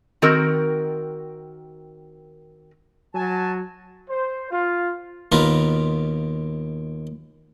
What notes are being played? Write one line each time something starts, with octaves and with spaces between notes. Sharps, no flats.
D#3 C4 F#4 A#4
F#3 G#5 A5
C5
F4
D#2 B2 F4 A#4 B4